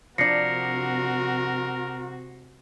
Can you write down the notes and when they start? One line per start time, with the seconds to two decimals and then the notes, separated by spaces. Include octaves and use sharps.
0.18 C3 F3 D4 F#4 A#4 A#6 C7 C#7